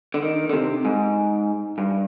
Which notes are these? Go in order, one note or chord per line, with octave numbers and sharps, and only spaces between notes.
D3
D#3
D3
C3
G#2
G2